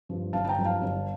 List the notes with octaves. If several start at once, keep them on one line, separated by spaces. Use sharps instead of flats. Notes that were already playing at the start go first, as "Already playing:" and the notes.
G2 F3
G1 F5 A5
A5
G5 A#5
G2 F3
F5 A5
G1